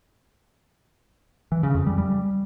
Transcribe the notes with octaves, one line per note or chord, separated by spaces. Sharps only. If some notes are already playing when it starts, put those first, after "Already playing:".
E3
C#3
F2
G3
G3